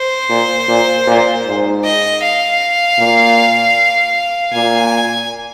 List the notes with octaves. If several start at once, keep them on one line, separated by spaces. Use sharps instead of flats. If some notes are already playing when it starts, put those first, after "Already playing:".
Already playing: C5
A#2
A#2
A#2
G#2
D#5
F5
A#2
A#2 G#5